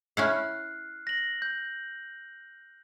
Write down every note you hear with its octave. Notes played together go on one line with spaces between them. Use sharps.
C#4 E4 F#5 F6 F#6 C7
A#6 F#7
G6